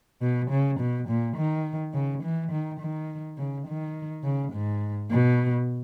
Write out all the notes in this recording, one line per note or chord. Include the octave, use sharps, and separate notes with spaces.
B2
C#3
B2
A#2
D#3
C#3
E3
D#3
D#3
C#3
D#3
C#3
G#2
B2